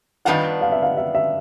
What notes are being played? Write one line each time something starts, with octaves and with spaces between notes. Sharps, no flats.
D#3 G3 B3 D4 F4 F#5
F5
E5
F5
E5
E5